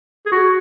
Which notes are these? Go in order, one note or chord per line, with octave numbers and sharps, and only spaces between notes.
G#4
F#4